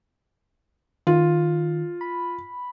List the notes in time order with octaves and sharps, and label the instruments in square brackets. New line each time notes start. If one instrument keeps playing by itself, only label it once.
[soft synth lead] D#3 [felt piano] F4
[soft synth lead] B5